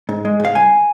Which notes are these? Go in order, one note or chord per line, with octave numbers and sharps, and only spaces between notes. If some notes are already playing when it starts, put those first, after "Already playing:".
G#2
G#3
G#2 F5
C2 G#5